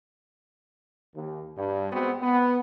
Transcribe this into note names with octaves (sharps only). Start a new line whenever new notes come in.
D#2
G2
G#3 B3 C4 F#4
B3